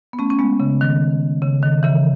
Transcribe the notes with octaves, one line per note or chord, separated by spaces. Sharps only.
B3
A3 C#4
C#4
G#3 B3
C#3
D#3
C#3
D#3
C#3 E3